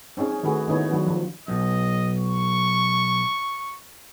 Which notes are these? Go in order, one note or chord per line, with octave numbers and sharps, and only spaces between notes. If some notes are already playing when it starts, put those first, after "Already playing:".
C4 C#4 D#4 G#4
D#3 A3 F#4 G#4 B4
D#3 B3 D#4 E4 C#5
D#3 F#3 D4 F#4
F3
B1 D#5
C#6